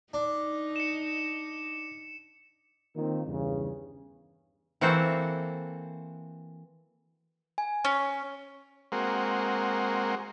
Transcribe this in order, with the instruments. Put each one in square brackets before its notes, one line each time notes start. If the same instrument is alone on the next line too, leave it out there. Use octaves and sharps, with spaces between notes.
[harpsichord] D4 [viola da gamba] D#4
[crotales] C#7 E7
[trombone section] D#3 A#3 C4 F4
E2 G2 C#3
[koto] E3 A#3 C4 F#4 A4 C5
[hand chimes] G#5
[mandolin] C#4
[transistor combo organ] G#3 A#3 C4 F#4